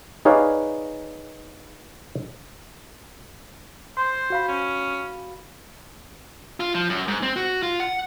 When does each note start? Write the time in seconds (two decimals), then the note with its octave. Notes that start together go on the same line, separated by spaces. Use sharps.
0.25 D#4 G#4 B4 C#5 D5 F5
3.97 C5 C6
4.30 F#4 F5 B5
4.48 C#4
6.60 F4
6.75 F3
6.89 F#2
7.08 G#2
7.22 C4
7.36 F#4
7.63 F4
7.80 F#5